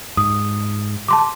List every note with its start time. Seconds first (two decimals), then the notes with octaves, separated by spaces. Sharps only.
0.17 G#2 D#6
1.08 A5 C6 D6